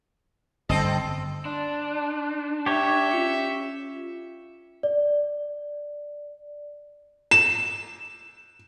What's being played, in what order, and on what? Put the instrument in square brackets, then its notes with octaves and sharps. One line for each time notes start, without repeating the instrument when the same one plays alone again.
[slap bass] G1 [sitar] C4 A4 D#5
[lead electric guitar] D4 [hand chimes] C6
[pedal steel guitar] G4 C#5 [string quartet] E5
[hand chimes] C#4 F4 C#7
[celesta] D5
[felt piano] E7